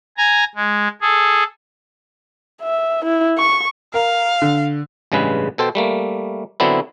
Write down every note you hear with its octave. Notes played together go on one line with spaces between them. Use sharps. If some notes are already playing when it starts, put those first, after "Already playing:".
G#5 A#5
G#3
G#4 A4
E5
E4
C#6
A#4 F5
D3
A1 G2 C#3 G#3 B4
B2 A4 C5 G5
G3 A3 A#3
D3 F#3 B3 C4 D4 E4